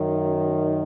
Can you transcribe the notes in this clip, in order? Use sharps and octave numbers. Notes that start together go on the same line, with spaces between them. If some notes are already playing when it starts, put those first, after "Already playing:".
Already playing: F#2 D#3